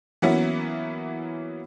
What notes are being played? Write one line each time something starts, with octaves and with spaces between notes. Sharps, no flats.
E3 F#3 A#3 B3 C#4 E4